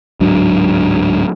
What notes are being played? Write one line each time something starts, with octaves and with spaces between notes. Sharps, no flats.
D1 G#2 F#3 D4